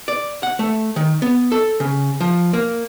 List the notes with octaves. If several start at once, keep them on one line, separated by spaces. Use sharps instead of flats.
D5
F#5
A3
D#3
B3
A4
C#3
F3
A#3